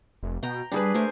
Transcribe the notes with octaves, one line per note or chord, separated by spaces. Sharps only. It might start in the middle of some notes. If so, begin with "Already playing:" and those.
F1
B2 G5 A#5
G3 D4 G#4 B4
A3 A#4 C5 G#5